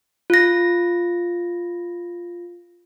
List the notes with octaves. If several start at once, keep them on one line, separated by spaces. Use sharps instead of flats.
F4 A#6